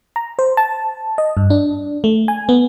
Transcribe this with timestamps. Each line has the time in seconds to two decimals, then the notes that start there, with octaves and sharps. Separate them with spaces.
0.16 A#5
0.39 C5
0.57 A5
1.18 D#5
1.37 G2
1.50 D4
2.04 A3
2.28 G#5
2.49 B3